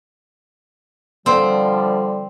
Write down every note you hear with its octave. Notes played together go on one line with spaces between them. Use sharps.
D3 F3 G3 C4